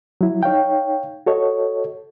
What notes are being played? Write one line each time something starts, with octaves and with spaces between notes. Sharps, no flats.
F#3 E4
D#4 C#5 F5 G5
F#4 A4 C#5 D#5